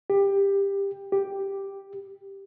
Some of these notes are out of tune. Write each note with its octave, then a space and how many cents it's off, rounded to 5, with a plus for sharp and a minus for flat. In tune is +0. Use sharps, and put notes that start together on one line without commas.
G4 +15
G4 +0